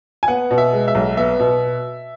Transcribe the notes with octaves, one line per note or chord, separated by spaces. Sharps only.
G#5
B3 F#5
B2
E5
G#3
E5
B1
B3 E5
B2